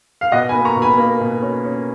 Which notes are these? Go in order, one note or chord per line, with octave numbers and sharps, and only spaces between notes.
F5
B2 D#5 F#5
G#5 B5
A#3
A#5 C#6
B2
G#5 B5
A#3
B2
C#4
C#4